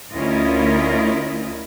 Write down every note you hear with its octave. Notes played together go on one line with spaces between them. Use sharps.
D2 C#4 E4 F4 A#4 D#5